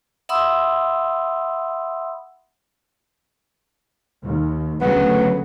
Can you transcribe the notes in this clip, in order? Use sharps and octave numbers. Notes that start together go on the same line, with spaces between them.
E5 F#5 B5 C6 D#6 E6
D#2
D2 C#3 F#3 B3